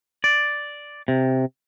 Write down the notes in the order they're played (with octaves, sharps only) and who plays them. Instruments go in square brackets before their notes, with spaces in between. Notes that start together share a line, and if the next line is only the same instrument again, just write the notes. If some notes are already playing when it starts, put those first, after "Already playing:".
[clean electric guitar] D5
C3